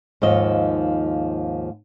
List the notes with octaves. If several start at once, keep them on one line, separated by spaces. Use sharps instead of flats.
D#2 G#2 F3 D#5